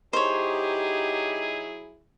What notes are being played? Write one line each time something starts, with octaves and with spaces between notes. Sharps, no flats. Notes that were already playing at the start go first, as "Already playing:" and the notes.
F#3 D#4 E4 G4 G#4 C5 C#5